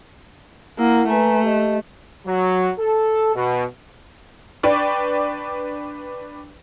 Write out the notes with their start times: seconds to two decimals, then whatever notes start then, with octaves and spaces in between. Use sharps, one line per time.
0.79 A#3 E4 F#5
1.08 A3 B4 G#5 A#5
1.43 G4 D#5
2.27 F#3
2.79 A4
3.35 B2
4.63 D4 B4 D5 G5 C#6 D6